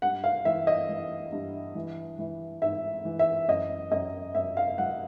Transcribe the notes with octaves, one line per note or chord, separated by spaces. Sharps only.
G2 F#5
F5
E3 E5
D#5
E3
G2
E3
E3
G#2 E5
E3
E5
F#2 D#5
F#2 D#5
F#2 E5
F5
F#3 F#5